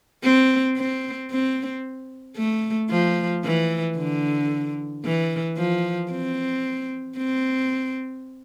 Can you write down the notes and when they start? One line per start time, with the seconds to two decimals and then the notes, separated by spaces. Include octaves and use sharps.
0.23 C4
0.77 C4
1.31 C4
2.37 A3
2.90 F3
3.44 E3
3.97 D3
5.05 E3
5.57 F3
6.11 C4
7.17 C4